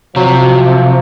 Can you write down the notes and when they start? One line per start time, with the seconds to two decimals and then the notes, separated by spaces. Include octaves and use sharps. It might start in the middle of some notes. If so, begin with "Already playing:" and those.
0.16 C3 F3 F#3